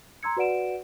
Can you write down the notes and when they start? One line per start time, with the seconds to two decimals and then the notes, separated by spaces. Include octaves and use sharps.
0.23 A#5 C6 E6 G#6 C#7
0.37 F#4 B4 D5 F#5 D7 E7